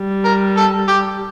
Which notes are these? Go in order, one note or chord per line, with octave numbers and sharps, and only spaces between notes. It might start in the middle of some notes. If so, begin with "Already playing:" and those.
Already playing: G3
A#4
A4
G4